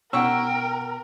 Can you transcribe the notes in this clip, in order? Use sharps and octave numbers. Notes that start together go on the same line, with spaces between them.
B2 A#4 F#5 G5 C#6 E6